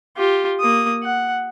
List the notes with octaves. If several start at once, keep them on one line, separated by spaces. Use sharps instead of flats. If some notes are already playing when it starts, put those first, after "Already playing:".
F4 G4
A#3 D#6
F#5